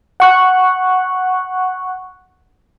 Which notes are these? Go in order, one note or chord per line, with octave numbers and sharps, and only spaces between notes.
F#5 C#6 F#6